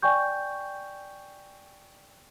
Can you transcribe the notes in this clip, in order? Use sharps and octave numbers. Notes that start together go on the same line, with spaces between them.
D5 G5 G#5 C#6 G6